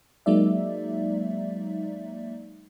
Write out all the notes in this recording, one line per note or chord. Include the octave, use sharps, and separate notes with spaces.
F#3 G#3 A#3 D#4 D5 E5